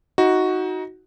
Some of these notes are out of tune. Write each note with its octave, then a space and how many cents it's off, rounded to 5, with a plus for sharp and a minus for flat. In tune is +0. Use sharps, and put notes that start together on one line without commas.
D#4 +25 F#4 +0